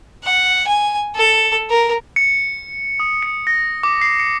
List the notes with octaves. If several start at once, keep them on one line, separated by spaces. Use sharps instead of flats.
F#5
G#5
A4
A#4
C#7
D#6
C#7
A#6
D6
C7
C#7